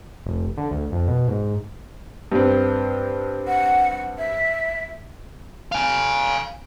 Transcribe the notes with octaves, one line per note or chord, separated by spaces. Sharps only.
F1
D3
D2
F2
B2
G#2
G2 C4
F#5
E5
F5 G#5